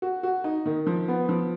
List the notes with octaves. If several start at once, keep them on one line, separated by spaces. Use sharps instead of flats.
F#4
F#4
D#4
D#3
F3
B3
F3